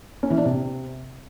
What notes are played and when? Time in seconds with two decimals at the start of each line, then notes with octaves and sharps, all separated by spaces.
0.23 C#4
0.30 E3
0.38 D4
0.45 C3